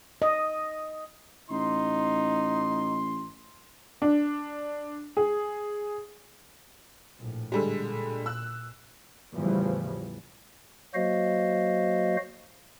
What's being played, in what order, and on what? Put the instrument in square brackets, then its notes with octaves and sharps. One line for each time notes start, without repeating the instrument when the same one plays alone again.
[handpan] D#5
[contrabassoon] A1 [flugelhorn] D#4 [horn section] C6
[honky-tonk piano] D4
G#4
[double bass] A#1 A2
[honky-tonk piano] D3 G3 G#3
[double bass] A#2
[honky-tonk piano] E6 F#6
[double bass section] E2 A2 C#3 E3 F3 G3
[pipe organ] F#3 A#3 F#4 C5 D#5 F5